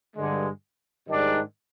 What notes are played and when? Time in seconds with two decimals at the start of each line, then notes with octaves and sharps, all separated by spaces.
0.16 G2 D3 G#3
1.08 G#2 D#3 G3 D4